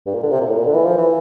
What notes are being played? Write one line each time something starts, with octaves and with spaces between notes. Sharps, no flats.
G2
A#2
D3
C3
A#2
A2
A#2
D3
E3
F3
E3